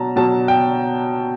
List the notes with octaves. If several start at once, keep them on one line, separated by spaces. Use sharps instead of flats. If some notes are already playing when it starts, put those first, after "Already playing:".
Already playing: B2 F#3 A5 A#5
B2 F#3 A5
G5